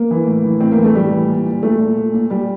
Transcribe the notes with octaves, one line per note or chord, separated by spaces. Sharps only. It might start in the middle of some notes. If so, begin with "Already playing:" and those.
Already playing: A#3
E3
A2
E3
A2 C4
A#3
E3
A3
A2 G3
E3
A#2
A#2
A#2 A3
A#2
A#2
A#2
A#2 G3